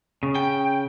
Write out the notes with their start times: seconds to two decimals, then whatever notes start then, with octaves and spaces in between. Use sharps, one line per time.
0.23 C#3
0.35 G5